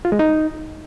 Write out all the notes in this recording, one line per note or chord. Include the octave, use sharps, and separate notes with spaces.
F4
G#3
D#4